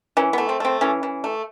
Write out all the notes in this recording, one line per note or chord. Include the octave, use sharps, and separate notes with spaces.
E3 C#4
A3 B3
C4
A3 C4
E3 C#4
E3
A3